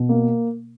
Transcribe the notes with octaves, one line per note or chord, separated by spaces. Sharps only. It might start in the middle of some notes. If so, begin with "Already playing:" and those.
Already playing: B2
A#3